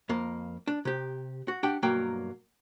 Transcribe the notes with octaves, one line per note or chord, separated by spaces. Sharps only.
F2 A#3
D4
C3 G4
F#4
D4 G4 F#5 G5
B1 G2 F#3 A#3 G5